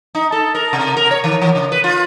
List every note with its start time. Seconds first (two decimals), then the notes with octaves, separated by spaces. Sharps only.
0.15 D#4
0.32 A4
0.55 A#4
0.73 C3
0.97 A#4
1.11 C#5
1.24 D#3
1.42 E3
1.55 C#3
1.72 B4
1.84 F4